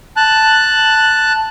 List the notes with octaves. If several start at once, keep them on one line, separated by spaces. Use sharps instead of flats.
A5 F#6